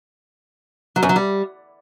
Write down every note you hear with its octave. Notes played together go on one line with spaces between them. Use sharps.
F#3
F#2
F#3
G3